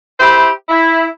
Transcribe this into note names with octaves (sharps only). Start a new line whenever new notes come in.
E4 G4 C5 E5 B5
E4